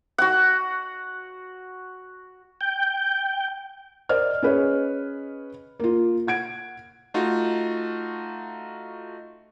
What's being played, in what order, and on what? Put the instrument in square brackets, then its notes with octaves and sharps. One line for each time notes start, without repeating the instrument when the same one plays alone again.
[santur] F#4 F#5
[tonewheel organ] G5
[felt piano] A#4 C5 D5 D#5 F6
C#4 G#4 B4 C#5 D#5
A#3 F4
F#5 G#6 D7
[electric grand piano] A3 D#4 F4 F#4